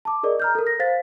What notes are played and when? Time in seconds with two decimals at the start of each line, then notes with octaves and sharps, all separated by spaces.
0.05 A5 D6
0.23 G#4 A#4 D5 D#5
0.40 A#5 F6 G6
0.55 A4 A#4
0.67 A#6
0.79 C5 F5 A6 B6